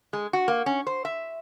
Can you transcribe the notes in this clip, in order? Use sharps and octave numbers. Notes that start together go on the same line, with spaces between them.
G#3
F#4
A#3
C#4
C5
E5